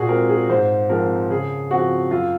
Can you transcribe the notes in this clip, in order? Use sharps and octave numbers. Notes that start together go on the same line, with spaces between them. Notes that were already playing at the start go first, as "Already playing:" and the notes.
Already playing: A#2 F#4 G#4
G#3 C4 A#4
G#4
G#2 C5
F3 G#3 C4 A#4
C#3 G#4
F3 C4 F#4
F#2 F4